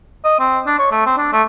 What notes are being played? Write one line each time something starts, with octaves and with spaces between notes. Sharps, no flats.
D#5
C4
D4
C#5
A3
C4
D4
A3